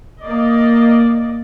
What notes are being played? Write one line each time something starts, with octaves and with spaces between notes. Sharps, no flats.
A#3 D5 D#5